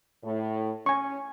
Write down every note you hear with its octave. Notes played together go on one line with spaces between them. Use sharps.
A2
C#4 G#5 C#6